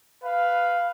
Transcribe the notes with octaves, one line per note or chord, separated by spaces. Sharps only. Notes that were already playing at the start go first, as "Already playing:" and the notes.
B4 F5